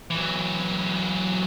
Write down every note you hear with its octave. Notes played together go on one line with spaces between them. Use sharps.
E3 F#3